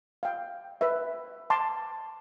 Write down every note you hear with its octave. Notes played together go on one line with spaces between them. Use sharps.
F5 G5
B4 E5
A5 C6 D6